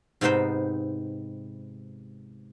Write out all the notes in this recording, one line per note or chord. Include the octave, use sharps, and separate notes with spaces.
G#2 C3 B3 D#4 C5 G5